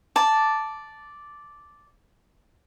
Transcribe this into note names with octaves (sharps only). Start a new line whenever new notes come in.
D5 A5